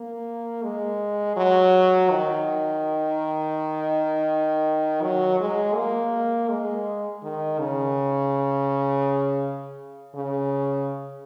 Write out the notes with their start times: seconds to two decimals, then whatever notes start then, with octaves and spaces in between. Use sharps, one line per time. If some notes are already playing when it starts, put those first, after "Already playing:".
Already playing: A#3
0.63 G#3
1.37 F#3
2.10 D#3
5.02 F#3
5.40 G#3
5.75 A#3
6.49 G#3
7.23 D#3
7.59 C#3
10.15 C#3